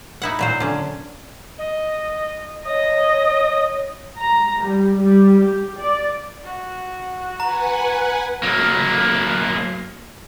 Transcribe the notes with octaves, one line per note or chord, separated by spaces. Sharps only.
D#4 E4 F#5
A#2 F#3 C5
D3 C#4
D#5
C#5 D#5 D#6
A#5
G3
G3
G4
D5
F#4
B4 F#5 G#5 A#5
F#3 A#3